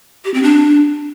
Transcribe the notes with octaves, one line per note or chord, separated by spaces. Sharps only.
G4
C4
D4